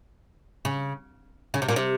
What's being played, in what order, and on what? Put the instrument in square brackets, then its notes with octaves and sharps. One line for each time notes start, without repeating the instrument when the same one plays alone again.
[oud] C#3
C#3
C3
A#2
C3